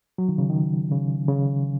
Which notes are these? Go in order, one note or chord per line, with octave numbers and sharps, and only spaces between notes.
F#3
D#3
C#3
D#3
C#3
C#3